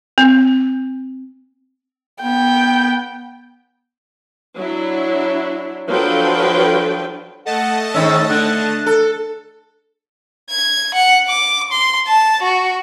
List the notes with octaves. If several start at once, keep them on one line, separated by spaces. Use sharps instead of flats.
C4
B3 G5
F#3 D4 E4
F3 F#3 D4 A4 B4 G5
A3 D#5 F#5 A5
G#2 D#3 C#4 E6
D3 F#6
A4
G#6
F#5
D6
C6
A5
F#4